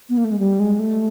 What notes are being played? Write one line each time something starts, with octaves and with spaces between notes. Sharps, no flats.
B3
A#3
A3
G#3
G3
G#3
A3